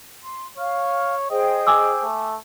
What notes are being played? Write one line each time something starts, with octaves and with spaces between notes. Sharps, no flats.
C6
C#5 F5 F6
G#4 C5 D#5 G5
G#5 D6 E6
A3